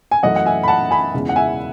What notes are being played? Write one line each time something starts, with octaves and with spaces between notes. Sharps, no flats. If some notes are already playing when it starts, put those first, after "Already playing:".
G#5
F#2 E3 A3 D#5 F#5
F#5
E5 G#5
B5
F#5 A5
G#5 B5
E2 C#3 E3 G#3
F#5
E5 G#5